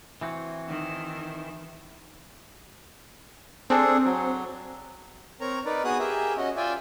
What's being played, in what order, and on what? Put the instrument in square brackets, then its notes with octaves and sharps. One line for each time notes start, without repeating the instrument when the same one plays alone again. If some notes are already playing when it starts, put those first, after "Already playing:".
[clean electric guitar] E3 C4 F#4
[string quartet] D#3
[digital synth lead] C4 [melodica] D4 G#4 A4
[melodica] F#3
[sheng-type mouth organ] C4 A#4 C#5 A#5
D#4 A#4 B4 D5
B3 F#4 G#4 D#6 F#6
G4 G#4 A#4 E5
C#4 F#4 D#5
F4 D5 E5 G5 G#5